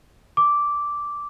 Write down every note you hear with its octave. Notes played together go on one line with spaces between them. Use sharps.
D6